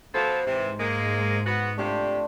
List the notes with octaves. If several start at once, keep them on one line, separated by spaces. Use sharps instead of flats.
B2 F3 A4 C5
G#2 C3 E3
G#3 A#3
B3 F#4
C3 A3 D4 F4 G4